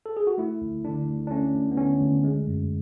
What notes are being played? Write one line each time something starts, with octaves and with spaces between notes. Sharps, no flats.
A4
G#4
F#4
A3 E4
D2
D3 D4
D2
D4
A3 C#4
D2
B3
D3 C#4
D2
G#3
F#2